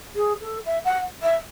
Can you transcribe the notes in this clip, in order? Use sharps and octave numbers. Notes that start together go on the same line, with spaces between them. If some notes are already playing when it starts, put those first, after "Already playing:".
G#4
A4
E5
F#5
E5